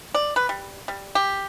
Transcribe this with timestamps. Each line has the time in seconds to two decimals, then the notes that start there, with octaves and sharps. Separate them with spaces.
0.14 D5
0.36 B4
0.49 G3
0.88 G3
1.15 G4